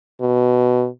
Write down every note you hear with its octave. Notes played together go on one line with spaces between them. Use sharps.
B2